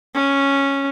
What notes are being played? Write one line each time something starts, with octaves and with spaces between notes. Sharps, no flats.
C#4